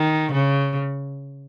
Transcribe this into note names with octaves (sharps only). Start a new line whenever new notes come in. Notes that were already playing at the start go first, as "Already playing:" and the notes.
Already playing: D#3
C#3